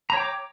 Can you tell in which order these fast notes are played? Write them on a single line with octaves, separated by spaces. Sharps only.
A#5 C#5 G5 D6